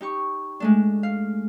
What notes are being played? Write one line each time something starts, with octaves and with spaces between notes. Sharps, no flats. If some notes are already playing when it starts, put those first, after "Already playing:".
D#4 G4 C#6
G#3 A3 D4
F5